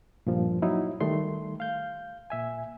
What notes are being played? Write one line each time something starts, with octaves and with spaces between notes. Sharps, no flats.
G2 A#2 F3
F#3 D#4 E4
D#3 G3 A3 C6
F5 G6
A#2 E5 G#5